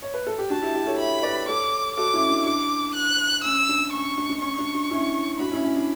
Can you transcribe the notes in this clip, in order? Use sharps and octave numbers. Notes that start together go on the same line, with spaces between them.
C#5
B4
A4
G4
D4 F#4 A5
E4 G4
E4 G4
A4 C#5
C#5 E5 B5
B4 D5
A4 C#5 D6
F#4 A4 D6
C#4 E4
D4
E4
D4 D6
F#6
C#4 E6
D4
C#4 C#6
D4
D4
C#4 C#6
D4
D4
C#4 E4
D4 F#4 B5
C#4 E4
C#4
D4